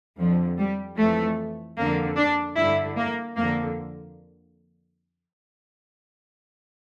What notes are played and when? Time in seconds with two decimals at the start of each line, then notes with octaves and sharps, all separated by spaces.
0.18 F2 D3 F3
0.58 G3
0.97 F2 E3 A3
1.77 F2 D3 A#3
2.16 D4
2.57 G2 D3 E4
2.97 A#3
3.36 F2 D3 A#3